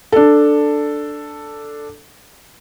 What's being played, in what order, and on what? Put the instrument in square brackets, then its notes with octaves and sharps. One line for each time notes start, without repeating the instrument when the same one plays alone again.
[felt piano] D4 A4